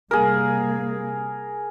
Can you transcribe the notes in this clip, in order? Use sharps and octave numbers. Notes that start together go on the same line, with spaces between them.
C3 G3 A#3 G#4 A#4